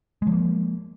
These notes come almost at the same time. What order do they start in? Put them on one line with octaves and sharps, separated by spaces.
G#3 F3 A#3